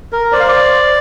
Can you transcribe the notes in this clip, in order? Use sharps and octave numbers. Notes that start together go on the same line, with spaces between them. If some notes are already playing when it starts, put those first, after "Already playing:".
A#4
C5 D5
F5
D5